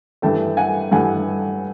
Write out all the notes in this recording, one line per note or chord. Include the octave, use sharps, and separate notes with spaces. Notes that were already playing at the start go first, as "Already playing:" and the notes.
G2 E3 A3 G5 A5
F#5 G#5
G2 E3 A3 F#5 G#5